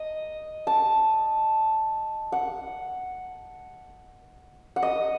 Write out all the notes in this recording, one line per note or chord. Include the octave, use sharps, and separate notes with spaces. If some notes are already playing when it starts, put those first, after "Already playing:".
Already playing: D#5
A5
F#5
F#5
D#5